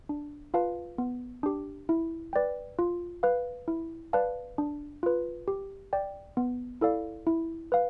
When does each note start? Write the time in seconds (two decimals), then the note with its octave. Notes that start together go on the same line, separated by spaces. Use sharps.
0.09 D4
0.54 F4 B4 F5 A5
0.98 B3
1.43 D4 G4
1.89 E4
2.33 B4 D5 G5
2.79 F4
3.23 B4 F5
3.68 E4
4.13 B4 D5 F5 A5
4.58 D4
5.03 F4 B4
5.48 G4
5.93 D5 G5
6.37 B3
6.81 E4 A4 D5 F5
7.27 E4
7.72 B4 F5